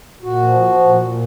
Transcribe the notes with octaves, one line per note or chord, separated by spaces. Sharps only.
A#2 F#4
F3
F3
A#2
A#2